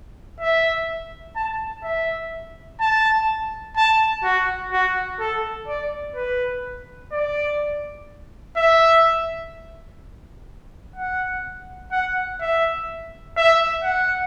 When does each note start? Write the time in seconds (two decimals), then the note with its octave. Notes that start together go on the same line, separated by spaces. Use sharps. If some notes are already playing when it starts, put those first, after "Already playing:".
0.41 E5
1.36 A5
1.84 E5
2.81 A5
3.77 A5
4.24 F#4
4.73 F#4
5.20 A4
5.68 D5
6.16 B4
7.12 D5
8.57 E5
10.96 F#5
11.92 F#5
12.41 E5
13.37 E5
13.84 F#5